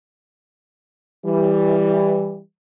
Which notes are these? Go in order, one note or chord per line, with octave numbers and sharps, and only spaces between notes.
E3 G3